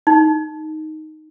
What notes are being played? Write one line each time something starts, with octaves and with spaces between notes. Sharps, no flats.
D#4